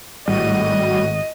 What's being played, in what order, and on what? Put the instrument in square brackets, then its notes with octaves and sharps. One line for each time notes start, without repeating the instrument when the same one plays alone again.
[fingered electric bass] G#1 [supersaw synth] A2 F#4 D#7 [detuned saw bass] G3 [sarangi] D#5